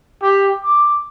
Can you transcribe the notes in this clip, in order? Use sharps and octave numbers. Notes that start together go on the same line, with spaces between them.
G4
D6